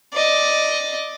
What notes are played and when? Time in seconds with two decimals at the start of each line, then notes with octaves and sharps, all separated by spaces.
0.13 D5 D#5